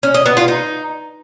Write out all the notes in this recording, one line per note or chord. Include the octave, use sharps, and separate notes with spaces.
C#4
D#5
B3
F4
D#4